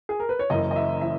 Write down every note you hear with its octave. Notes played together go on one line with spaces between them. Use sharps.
G#4
A#4
B4
C#5
F#1 F#2 E3 D#5
D#5
E5
E3 E5